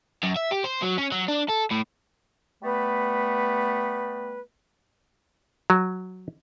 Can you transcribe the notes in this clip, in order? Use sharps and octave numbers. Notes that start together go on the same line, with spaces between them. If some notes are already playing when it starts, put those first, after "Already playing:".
F#2
E5
G4
C5
F#3
C#4
F#3
D4
A4
A2
G3 A3 B3 B4
F#3